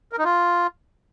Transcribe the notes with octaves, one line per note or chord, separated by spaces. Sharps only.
A#4
D#4
F4